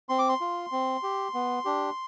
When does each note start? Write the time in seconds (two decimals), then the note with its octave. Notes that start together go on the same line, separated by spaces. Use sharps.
0.09 C4 C6
0.19 D6
0.29 C6
0.41 F4
0.72 C4
1.03 G4
1.34 B3
1.65 D4 G4